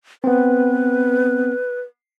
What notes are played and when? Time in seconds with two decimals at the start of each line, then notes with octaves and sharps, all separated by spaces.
0.24 B3 C4 B4